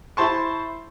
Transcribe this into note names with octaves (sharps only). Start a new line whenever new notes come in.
E4 C5 A5 C6 C#6